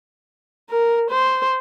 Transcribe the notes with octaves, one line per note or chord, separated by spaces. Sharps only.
A#4
C5